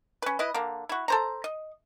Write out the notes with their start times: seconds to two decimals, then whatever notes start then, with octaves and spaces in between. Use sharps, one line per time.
0.22 C#4 B4
0.39 E4 B4 D#5
0.54 D3 A#3
0.89 E4 F#4
1.08 A4 C5 A#5
1.44 D#5